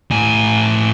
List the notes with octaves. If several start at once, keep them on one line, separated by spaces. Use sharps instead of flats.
A2 G#5